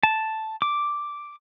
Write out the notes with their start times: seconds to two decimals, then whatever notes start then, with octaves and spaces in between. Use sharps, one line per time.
0.03 A5
0.62 D6